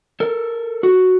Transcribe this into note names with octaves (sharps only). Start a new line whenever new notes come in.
A4 A#4
F#4